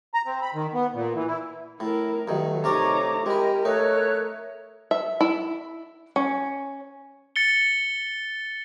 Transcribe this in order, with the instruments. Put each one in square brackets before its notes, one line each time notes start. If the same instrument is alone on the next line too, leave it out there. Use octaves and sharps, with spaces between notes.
[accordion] A#5
C4
B5
D#3
B3
A#2
E3
E4
[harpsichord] A2 [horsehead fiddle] E4 A#4
[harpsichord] G2 D#3 [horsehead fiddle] F#3 [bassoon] A3
[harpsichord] C3 A#4 D5 [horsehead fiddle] D#4 A#5 [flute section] C#5 C#6 D6
[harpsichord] G#3 E4 [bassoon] G4 [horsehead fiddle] A#4 [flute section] D#5
[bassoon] A3 [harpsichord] D#4 [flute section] C#5 F#6
[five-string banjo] E5
E4
C#4
[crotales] A6 C#7 G7